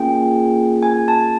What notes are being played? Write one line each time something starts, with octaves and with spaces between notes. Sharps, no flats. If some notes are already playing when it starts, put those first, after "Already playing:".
Already playing: A#3 C#4 F4 G#4 G5
G#5
A5